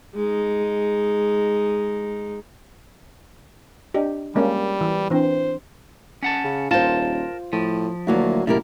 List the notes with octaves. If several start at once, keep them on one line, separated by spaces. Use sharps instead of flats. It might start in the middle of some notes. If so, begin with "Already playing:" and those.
G#3 D#4
D4 G4 D5 D#5
G3 G#3 A#3 C#4
E3
E3 C4 D4 C5 G5
C#4 F#5 A5
C#3
D#1 F4 A#4 C5 A5
A2 F3
D2 F#3 A#3 E4
F#1 B2 E4 G4 A#4